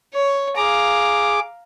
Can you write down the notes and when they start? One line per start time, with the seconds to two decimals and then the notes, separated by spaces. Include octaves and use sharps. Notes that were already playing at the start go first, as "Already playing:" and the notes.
0.14 C#5
0.57 G#4 F5 A#5 D6